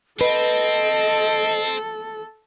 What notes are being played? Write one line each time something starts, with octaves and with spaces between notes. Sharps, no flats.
C4 A4 B4 D#5